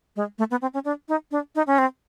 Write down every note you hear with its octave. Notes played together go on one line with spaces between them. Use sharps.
G#3
A3
B3
C4
C#4
D4
D#4
D4
D#4
C#4
C4